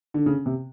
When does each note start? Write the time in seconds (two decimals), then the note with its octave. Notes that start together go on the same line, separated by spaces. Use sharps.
0.14 D3
0.26 C#3
0.46 C3